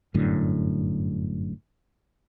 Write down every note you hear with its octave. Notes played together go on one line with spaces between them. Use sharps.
G1 F#2 A2 D3